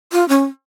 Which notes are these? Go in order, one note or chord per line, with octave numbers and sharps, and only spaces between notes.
F4
C#4